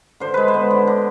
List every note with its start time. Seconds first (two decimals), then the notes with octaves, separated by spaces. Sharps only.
0.20 D3 C5
0.34 G#3 B4
0.48 C5
0.54 B3
0.71 D3
0.87 D3